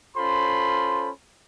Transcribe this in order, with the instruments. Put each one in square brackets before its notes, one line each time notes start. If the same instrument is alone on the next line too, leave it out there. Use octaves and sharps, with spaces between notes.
[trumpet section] C#4 F4 A4 C5 B5 C6